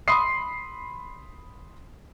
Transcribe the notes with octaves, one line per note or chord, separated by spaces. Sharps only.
B5 C6 D#6 C7